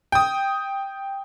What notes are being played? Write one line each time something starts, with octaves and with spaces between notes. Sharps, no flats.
G5 D#6